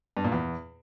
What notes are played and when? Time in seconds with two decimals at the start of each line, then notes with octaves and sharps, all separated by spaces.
0.17 G2
0.24 A#2
0.32 E2